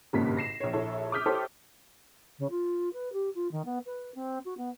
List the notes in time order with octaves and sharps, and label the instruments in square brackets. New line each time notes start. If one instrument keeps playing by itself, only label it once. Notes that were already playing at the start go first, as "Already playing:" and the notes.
[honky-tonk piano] G#1 G2 A#2 C#3 A#3 B6
A#6 C7 E7
A#1 C#5
A#1 E4 A4 C#5
D6 D#6 F6 G6 B6
E4 G4 A4 C5 C#5
[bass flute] C#3
F4
B4
G4
F4
D#3
B3
B4
C4
F#4
B3